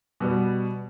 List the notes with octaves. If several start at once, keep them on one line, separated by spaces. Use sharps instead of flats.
B2 G3 B3